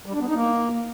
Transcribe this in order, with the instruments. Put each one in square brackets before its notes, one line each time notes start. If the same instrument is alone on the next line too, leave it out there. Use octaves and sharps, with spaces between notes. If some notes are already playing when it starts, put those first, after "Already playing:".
[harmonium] G3
D4
B3
D#4
A#3